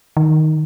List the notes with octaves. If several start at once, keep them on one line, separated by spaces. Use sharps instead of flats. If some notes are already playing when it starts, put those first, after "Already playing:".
D#3